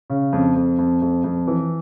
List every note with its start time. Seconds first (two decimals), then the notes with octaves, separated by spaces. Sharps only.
0.10 C#3
0.32 F2
0.55 F2
0.78 F2
1.01 F2
1.24 F2
1.47 E3